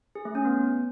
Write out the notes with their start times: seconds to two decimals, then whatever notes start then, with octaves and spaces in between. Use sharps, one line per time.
0.15 G#4
0.25 A3
0.35 C#4
0.45 B3